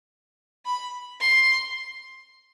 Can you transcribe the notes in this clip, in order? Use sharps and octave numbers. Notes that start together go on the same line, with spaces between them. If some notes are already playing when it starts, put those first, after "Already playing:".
B5
C6